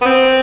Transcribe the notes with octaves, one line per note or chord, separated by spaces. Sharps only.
B3
C4